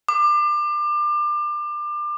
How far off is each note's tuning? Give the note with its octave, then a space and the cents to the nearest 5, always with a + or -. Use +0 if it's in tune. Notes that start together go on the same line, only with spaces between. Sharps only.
D6 +30